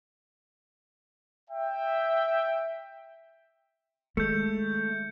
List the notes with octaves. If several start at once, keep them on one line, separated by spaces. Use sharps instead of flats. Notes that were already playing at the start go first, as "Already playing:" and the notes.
E5 G5
D#3 G#3 A3 G6 C#7